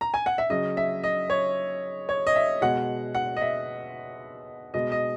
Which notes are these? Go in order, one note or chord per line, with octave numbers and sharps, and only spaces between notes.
A#5
G#5
F#5
E5
C#3 F#3 D#5
E5
D#5
C#5
C#5
D#5
E5
B2 G#3 F#5
F#5
D#5
E5
B2 G#3 D#5
D#5